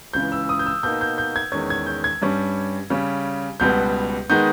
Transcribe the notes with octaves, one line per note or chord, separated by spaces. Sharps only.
C#2 C#3 E3 G6
E6
D#6
G6
E6
B2 A#3 D#4 G6
G6
G6
G#6
E2 D#3 G#3 C#4 G#6
G#6
G6
G#6
G2 G3 C#4
C#3 G3 C#4
C#2 B2 G3 B3 G6
D#3 G#3 B3 D#4 G6